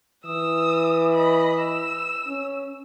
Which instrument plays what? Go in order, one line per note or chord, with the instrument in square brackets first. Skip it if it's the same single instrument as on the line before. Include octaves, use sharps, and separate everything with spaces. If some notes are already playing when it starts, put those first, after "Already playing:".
[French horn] E3 [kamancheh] D#6 E6
[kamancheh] D#5 B5
E6
[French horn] C#4